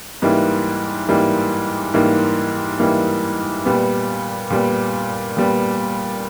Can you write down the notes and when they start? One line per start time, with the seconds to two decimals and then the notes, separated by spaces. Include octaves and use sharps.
0.22 G#2 E3 G3 A#3
1.09 G#2 E3 G3 A#3
1.94 G#2 E3 G3 A#3
2.79 G#2 E3 G3 A#3
3.65 A#2 G3 B3
4.50 A#2 G3 B3
5.37 A#2 G3 B3